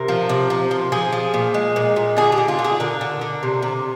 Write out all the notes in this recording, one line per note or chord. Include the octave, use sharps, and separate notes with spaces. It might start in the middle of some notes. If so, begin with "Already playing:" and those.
Already playing: C3 A#4
F3
C3
F3
F3
F3 G#4
F3
A#2
G#3
A#2
A#2
D3 G#4
G4
D3
F4
D3
G#4
D3 A#4
D3
D3
C3
C3